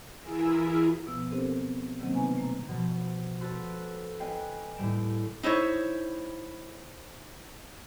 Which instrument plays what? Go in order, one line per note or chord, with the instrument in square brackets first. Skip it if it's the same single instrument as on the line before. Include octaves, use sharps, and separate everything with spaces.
[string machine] E3 E4 F4 G#4 A#4 E5
[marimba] B2 F3 B3 E6
C4 D4 G4 A4 A#4 C5
B3
C3 D#3 F#3 A#3 C4 C#4
B3 C#4 D#4 B4 G#5 A#5
B2 A3 A#5
[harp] B2 F3
F#4 A4 B4 C5
B4 D#5 F5 G5 G#5
D#2 A2 G3 D7 E7
[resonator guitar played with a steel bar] D#4 E4 C5 C#5